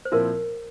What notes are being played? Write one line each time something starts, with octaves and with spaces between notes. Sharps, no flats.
C5
A#2 F3 C4 E4 A#4